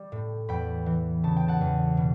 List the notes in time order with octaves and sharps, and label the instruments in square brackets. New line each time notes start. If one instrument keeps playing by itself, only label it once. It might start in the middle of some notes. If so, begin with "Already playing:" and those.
Already playing: [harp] G3
A2
E2 G5 B5
E3
C#3 A5
G5
F#5 A5
E2
B2